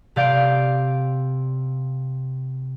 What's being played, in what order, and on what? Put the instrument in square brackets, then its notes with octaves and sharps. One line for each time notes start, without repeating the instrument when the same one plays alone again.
[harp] C3 D5 F5 G6 D7